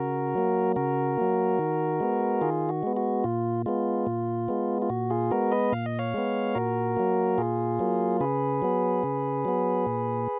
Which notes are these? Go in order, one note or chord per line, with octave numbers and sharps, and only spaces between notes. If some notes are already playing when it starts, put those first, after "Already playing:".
Already playing: C#3 F#4 A#4
F#3 A#3
C#3 F#4 A#4
F#3 A#3
D#3
G#3 B3
D#3 F4 G#4
F#4
G#3 B3
F#4
A#2 F4
G#3 B3 F4
A#2
G#3 B3
F4
A#2 F#4
F4 G#4
G#3 B3 F#4 A#4
B4 D#5
A#2 F5
D#5
C#5 F5
G#3 B3
A#2 F#4 A#4
F#3 A#3
A#2 F4 G#4
F#3 A#3
C#3 G#4 B4
F#3 B3
C#3
F#3 B3
A#2